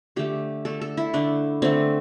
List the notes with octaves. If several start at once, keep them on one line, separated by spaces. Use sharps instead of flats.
D3 A3 G4
D3 A3 A4
A4
E4
D3 A3 D4
D3 A3 C4